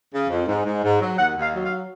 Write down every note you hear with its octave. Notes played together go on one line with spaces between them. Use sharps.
C#3
F2
G#2
G#2
G#2
F#3
D#2 F#5
D#2
F5
F#3
F5